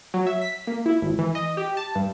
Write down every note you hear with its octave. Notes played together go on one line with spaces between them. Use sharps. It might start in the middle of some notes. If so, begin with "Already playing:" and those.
F#3
E5
B6
A#3
E4
G#1
E3
D#5
G4
A5
G2